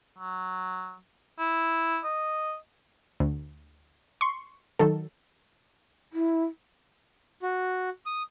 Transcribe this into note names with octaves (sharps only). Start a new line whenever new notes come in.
F#3
E4
D#5
D2
C6 C#6
D#3 F#3 A4
E4
F#4
D#6